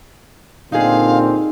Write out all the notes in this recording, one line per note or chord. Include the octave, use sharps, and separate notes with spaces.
A#2 D3 C4 D#4 G#4 F5